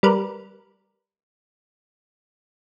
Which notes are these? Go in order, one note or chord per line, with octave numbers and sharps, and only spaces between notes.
G3 A#4 B4